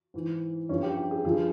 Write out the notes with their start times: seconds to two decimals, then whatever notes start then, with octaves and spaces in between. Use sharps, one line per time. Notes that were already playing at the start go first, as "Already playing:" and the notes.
0.14 G#2 E3
0.69 G2 F3 C#4
0.83 G4
0.97 G4
1.11 G#4
1.24 G2 F3 G#4